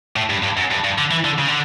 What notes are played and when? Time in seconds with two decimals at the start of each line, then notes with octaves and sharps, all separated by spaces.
0.16 A2
0.30 G2
0.43 G2
0.57 F#2
0.71 G2
0.84 G2
0.98 D3
1.11 E3
1.25 D3
1.38 C#3
1.48 D3